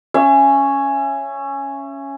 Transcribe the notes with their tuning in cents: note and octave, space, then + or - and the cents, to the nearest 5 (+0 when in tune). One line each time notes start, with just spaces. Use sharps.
C#4 +0 E5 +35